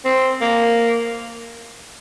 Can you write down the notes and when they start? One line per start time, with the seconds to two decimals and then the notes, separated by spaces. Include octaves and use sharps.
0.05 C4
0.41 A#3